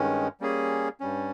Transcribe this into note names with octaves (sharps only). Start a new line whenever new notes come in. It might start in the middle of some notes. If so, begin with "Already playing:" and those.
Already playing: G2 D#3 G#3 C#4
G3 A#3 C#4 G#4
G2 G3 C#4